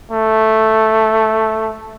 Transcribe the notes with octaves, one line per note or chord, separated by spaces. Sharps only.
A3